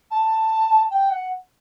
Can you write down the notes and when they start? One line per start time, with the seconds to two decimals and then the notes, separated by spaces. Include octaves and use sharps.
0.10 A5
0.90 G5
1.09 F#5